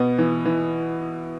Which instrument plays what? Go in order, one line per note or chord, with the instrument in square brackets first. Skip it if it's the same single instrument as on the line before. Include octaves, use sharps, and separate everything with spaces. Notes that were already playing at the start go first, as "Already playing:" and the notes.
Already playing: [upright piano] B2 B3
E3
E3